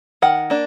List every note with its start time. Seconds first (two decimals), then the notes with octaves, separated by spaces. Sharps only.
0.22 D#3 F#5
0.50 A#3 D4